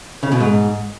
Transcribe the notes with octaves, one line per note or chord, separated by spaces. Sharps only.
C#3
B2
G#2